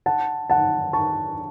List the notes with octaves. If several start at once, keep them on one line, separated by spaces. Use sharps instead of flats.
F#5 A5
F#5 A5
A5 C#6